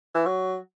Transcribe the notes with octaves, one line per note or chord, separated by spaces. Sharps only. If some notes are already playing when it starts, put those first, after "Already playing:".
E3
F#3